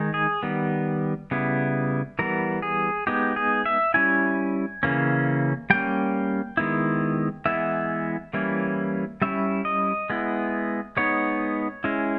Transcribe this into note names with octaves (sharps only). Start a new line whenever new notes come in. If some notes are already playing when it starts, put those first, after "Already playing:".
Already playing: D#3 G#3 D#4
G#4
D#3 G3 B3
C#3 G3 B3 E4
E3 G3 B3 A#4
G#4
G#3 B3 D#4 G4
G#4
E5
G3 C#4 E4 G#5
C#3 E3 A#3 C#4
G3 A#3 C#4 G5
D#3 G#3 B3 E4
E3 G#3 B3 E4 E5
E3 G3 A#3 C#4 E4
G3 C#4 E4 E5
D#5
G#3 B3 E4
G#3 B3 D#4 C#5
G#3 C#4 E4